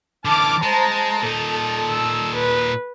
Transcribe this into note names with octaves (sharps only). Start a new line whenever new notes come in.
D3 E3 A5 D6 F6
G#3 C5 A5 A#5
A#2 D#4 A4
E6
B4